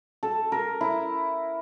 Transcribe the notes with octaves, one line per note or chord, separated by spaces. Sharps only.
A4
A#4
E4